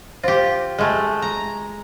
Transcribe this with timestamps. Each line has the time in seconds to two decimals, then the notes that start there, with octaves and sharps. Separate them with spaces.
0.24 F4 G4 C5
0.78 G#3 A3 G#4
1.22 A#5